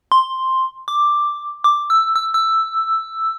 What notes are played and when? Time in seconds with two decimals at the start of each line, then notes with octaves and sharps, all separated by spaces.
0.12 C6
0.88 D6
1.64 D6
1.90 E6
2.16 E6
2.34 E6